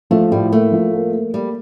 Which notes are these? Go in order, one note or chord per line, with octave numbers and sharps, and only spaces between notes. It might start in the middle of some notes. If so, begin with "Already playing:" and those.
F3 A3
A2 G3
A3 A#3
F3
A#3
A#3
G3 A#3